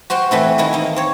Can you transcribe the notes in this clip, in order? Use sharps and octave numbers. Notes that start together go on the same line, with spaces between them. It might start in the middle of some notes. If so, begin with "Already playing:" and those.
F#4 C5 F#5 G5
E3 A3 C4 E4
D#3 E4 A4 D#5
A#3 D#4
C4 C#5